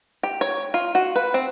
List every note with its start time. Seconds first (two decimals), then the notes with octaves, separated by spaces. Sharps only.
0.23 G4
0.41 C#5
0.74 F4
0.95 F#4
1.16 B4
1.34 C4